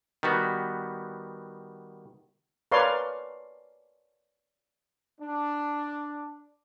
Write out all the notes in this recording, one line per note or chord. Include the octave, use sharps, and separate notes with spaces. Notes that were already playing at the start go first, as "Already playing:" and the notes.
D#3 G3 B3 F#4
A#4 B4 C#5 D5 F5 C6
D4